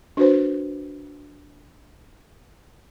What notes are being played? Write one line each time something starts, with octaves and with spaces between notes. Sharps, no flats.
D4 F#4 B4 C5